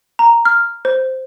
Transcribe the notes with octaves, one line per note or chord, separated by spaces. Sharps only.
A#5
F6
C5